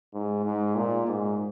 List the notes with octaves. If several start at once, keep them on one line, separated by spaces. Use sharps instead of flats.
G#2
G#2
A#2
G#2